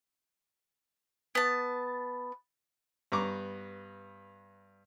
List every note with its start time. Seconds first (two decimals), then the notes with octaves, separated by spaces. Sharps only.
1.35 B3 A5
3.12 G2 B3 A#5 C#6 D6